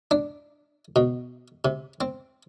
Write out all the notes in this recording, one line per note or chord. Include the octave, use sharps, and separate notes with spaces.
D4
B2
C3
C4